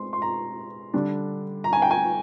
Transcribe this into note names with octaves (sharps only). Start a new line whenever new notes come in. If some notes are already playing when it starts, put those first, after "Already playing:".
Already playing: G#3 C4 C6
C6
A#5
D3 G3 D4
A#5
G#5
G5
G#5